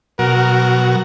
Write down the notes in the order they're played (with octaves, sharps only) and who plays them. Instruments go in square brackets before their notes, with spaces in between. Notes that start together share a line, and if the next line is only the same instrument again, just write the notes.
[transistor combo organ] B2 F#3 F#4 [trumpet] A#4